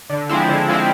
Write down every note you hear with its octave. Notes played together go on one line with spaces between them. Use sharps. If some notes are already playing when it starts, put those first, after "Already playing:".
D3
F3 G#3 C4 E4
D3
F3 G#3 C4 E4